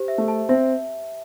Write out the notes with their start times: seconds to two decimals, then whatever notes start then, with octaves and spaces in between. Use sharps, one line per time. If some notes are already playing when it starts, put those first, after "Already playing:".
Already playing: G4 C5
0.08 E5
0.18 A3
0.28 A5
0.49 C4 E5